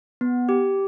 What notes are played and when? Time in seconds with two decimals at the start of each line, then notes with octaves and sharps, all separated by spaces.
0.21 B3
0.49 G4